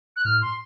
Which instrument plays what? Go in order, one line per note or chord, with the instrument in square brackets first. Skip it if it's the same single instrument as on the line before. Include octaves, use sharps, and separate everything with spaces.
[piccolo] F#6
[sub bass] A2 [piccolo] F6
[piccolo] C6